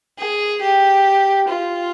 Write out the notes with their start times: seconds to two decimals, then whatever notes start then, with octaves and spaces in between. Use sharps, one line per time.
0.18 G#4
0.62 G4
1.48 F4